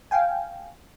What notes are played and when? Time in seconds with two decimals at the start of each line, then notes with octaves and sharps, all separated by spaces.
0.11 F5 G5 G#5